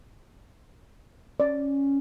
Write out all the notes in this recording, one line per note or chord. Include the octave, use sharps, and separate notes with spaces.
C#4 D5